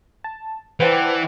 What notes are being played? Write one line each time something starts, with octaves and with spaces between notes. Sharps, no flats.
A5
E3 B4 C5 D5 F#5 G5 A5